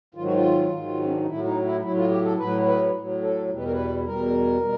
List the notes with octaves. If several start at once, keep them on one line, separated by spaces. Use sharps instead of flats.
G#2 D#3 F#3 F4
F#4
F4
G#2 D#3 F#3
C#4
D4
D#4
A2 F#3 E4
D#4
E4
A2 F#3 E4
F4
G4
A4
A2 F#3 B4
B4
A2 F#3
A4
E2 B2 G3
B4
A#4
B4
E2 B2 G3 A#4
B2 G3